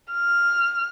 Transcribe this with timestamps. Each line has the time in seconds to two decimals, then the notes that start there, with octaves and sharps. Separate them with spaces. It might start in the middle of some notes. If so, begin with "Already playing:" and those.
0.13 F6